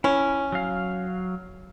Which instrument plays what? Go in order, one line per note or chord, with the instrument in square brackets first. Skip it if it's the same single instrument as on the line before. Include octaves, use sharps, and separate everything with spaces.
[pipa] C#4 [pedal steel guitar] E4
[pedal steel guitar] F#3 F5